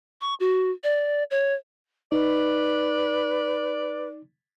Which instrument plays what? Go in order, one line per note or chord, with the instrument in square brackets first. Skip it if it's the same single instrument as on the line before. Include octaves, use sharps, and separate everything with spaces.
[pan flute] C#6
F#4
D5
C#5
[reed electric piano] D#4 [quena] B4 [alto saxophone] D5